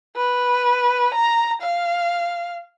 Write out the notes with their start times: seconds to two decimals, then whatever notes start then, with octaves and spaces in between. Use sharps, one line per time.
0.16 B4
1.15 A#5
1.62 F5